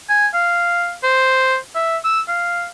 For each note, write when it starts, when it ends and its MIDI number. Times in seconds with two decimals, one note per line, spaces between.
0.09 0.27 80
0.34 0.93 77
1.04 1.57 72
1.75 1.97 76
2.04 2.21 88
2.28 2.67 77